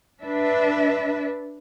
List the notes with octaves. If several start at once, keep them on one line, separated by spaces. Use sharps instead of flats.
D4 B4 E5